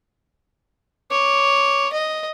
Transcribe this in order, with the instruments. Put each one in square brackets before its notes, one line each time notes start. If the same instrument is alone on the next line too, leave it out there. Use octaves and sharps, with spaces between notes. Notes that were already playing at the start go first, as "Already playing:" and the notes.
[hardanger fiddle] C#5 [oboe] D6
[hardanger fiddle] D#5